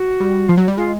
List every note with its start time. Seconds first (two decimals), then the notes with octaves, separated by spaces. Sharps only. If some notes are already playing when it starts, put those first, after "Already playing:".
Already playing: F#4
0.20 G3
0.49 F3 F4
0.57 F#3 F#4
0.68 G3
0.77 G#3 F4